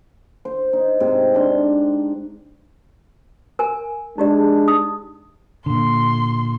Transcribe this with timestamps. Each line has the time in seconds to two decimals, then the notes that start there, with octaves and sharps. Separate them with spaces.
0.45 C5
0.73 D#4
1.00 G#2 C3
1.35 D4 C6
3.59 A#4 G#5
4.18 G#3 D4 D#4 G4 D5
4.68 D#4 D#6
5.66 A#2 D3 C6